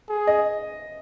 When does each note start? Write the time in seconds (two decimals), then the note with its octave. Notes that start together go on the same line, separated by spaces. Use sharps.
0.09 G#4
0.27 D#5